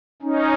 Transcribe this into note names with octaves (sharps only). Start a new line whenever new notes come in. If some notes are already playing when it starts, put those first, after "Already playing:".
C#4 D#4